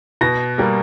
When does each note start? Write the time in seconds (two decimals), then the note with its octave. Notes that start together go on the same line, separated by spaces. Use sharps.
0.21 B2 A#6
0.58 G3 A#3